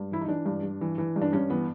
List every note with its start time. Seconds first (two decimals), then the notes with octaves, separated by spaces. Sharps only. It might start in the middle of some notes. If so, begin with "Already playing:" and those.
Already playing: G2
0.11 E3 E4
0.21 D#4
0.28 E3 D4
0.46 G2
0.63 G2
0.81 E3
0.98 E3
1.16 G2
1.22 D4
1.33 G2 C#4
1.50 E3 B3